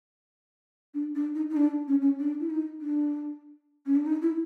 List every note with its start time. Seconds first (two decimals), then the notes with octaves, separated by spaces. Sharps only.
0.94 D4
1.15 D4
1.35 D#4
1.50 D#4
1.57 D4
1.88 C#4
2.01 C#4
2.19 D4
2.40 E4
2.50 D#4
2.81 D4
3.86 C#4
3.96 D4
4.06 D#4
4.22 E4